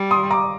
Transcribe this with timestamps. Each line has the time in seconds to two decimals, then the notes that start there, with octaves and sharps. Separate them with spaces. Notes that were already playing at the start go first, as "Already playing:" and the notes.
Already playing: G3
0.11 C6 D#6
0.30 A#5 D6